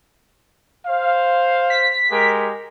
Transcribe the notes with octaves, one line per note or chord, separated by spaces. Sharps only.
C5 F5
B6
G#3 G4 A#4